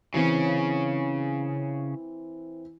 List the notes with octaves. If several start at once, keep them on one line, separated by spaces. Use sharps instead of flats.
C#3 E3 C4 C#4